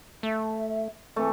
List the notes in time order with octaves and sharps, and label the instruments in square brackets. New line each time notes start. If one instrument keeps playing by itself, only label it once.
[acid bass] A3 [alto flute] E5
[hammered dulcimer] E3 A3 [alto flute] C4